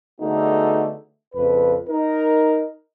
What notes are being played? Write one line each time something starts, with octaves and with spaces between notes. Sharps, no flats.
D3 A3 B3 D#4 F#4 G#4
A#1 F2 C#3 B4
D#4 A#4